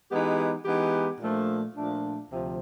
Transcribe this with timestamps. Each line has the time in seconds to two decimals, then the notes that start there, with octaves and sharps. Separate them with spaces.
0.10 E3 G#3 B3 D#4 G4
0.65 E3 G#3 B3 D#4 G4
1.20 A#2 F3 A3 D4
1.75 A#2 F3 A3 D4
2.29 D2 C3 F3